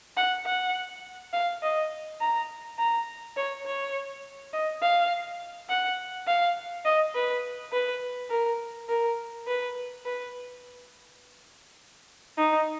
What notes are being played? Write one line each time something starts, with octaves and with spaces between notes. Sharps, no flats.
F#5
F#5
F5
D#5
A#5
A#5
C#5
C#5
D#5
F5
F#5
F5
D#5
B4
B4
A#4
A#4
B4
B4
D#4